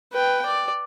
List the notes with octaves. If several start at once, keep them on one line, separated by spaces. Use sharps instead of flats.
B4 G5
D5